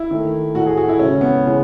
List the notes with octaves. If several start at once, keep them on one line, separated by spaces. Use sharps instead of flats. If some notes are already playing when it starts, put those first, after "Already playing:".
Already playing: E4
D#3 A3
A2 E3 A3 F#4
G#4
F#4
E4
C#3 G#3 C#4
B3
C#3 E3 G#3